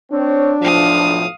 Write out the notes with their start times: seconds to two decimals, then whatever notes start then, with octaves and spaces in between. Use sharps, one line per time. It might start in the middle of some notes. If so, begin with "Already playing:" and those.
0.12 C4 D4 C#5
0.62 B1 A2 F3 F5 D#6